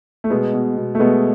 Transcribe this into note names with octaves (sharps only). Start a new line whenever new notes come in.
A3
B2 G#3 B3
B2
B2
A3
B2 G#3 B3